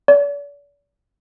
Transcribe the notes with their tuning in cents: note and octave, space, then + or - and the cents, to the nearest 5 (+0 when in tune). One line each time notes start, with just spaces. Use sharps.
D5 -40